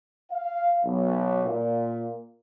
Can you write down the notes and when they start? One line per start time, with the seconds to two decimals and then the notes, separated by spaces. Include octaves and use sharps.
0.31 F5
0.84 B1
1.45 A#2